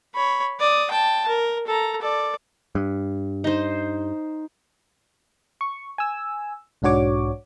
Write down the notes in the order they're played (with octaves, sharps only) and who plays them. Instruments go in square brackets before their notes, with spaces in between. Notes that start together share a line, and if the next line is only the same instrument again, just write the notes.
[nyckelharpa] C#5 B5
D5 D#6
G5 A5
A#4
A4 A#5
A4 D5
[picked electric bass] G2
[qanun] D#4 C5
[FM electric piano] C#6
G#5 E6
B1 G#2 D4 F#4 C#5 D6